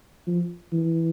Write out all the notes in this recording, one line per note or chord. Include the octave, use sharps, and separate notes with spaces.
F3
E3